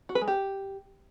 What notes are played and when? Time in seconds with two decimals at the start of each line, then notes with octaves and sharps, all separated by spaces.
0.09 F#4
0.15 B4
0.21 G#3
0.28 G4